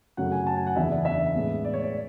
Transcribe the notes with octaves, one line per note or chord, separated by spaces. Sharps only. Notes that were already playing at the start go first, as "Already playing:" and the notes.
F#2 C#3 F#3 A3 C#4 F#5
G#5
A5
G#5
F#5
E2 C#3 E3 B3 D4 E5
D5
E5
A2 G#3 B3
D5
C#5
D5